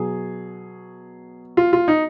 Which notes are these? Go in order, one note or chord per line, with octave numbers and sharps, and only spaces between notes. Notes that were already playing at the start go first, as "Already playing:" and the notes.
Already playing: B2 F#3 G#4
F4
F4
D#4